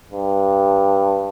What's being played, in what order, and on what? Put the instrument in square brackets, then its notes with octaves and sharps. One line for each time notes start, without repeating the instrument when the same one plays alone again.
[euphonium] G2